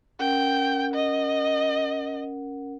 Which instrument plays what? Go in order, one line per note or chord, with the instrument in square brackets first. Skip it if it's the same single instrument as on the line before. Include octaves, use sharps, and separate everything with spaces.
[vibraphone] C#4 A#4 F#5 [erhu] G5
[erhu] D#5